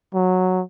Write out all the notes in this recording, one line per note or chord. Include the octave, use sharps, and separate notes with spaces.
F#3